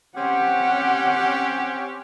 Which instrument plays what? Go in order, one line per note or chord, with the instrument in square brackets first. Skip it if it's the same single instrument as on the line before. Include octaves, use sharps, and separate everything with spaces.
[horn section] C4 C#4 G4 [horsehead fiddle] F#5